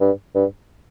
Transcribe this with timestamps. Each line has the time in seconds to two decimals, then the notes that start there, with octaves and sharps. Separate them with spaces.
0.01 G2
0.35 G2